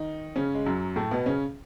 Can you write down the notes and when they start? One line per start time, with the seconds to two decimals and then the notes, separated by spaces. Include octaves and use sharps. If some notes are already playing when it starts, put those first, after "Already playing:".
Already playing: D#3 D#4
0.36 C#3 C#4
0.54 G#3
0.66 F#2 F#3
0.96 A2 A3
1.11 B2 B3
1.26 C#3 C#4